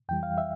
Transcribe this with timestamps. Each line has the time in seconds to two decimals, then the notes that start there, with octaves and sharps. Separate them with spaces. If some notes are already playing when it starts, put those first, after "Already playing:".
0.09 F2 E3 G3 G5
0.23 F5
0.38 E5